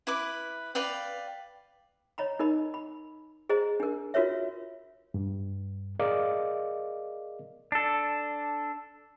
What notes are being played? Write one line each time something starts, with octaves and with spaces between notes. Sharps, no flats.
E4 B4 D6
B4 D5 F5 G5
C#5 D#5 A#5 B5
D#4 A#4 D#5 B5
B5
G#4 C5 D#5 A#5
D4 A#4
F4 F#4 A#4 B4 C#5 E5
G2
G#4 A#4 D5 D#5 F5 D6
D4 A4